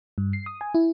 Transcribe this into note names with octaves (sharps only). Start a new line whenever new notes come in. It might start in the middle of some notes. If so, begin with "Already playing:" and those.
G2
C7
D#6
G#5
E4